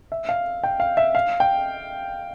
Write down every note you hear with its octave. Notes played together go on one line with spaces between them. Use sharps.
E5
F5
G5
F5
E5
F5
G5